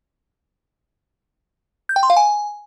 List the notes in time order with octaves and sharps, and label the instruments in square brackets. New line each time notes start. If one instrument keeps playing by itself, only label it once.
[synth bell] G6
G5
C6
F5
G#5